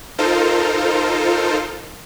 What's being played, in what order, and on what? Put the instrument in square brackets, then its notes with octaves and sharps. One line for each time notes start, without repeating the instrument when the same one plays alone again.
[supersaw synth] D#4 F4 A4 A#4 C5